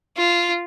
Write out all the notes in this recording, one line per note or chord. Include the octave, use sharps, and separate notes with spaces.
F4